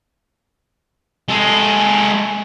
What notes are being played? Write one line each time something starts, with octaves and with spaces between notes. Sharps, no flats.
G#3 A4